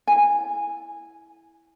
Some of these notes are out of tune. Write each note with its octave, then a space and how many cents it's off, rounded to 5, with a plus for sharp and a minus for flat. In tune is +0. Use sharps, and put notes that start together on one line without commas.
E4 +0 G#5 -15